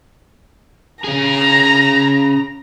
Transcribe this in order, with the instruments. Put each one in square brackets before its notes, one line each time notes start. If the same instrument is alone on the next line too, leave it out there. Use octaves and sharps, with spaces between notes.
[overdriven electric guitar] C#4 G#4 [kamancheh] A#5